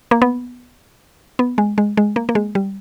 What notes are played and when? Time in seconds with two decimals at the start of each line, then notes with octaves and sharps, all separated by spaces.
0.11 A#3
0.22 B3
1.39 B3
1.58 G#3
1.78 G#3
1.97 G#3
2.16 A#3
2.29 A#3
2.35 G#3
2.55 G3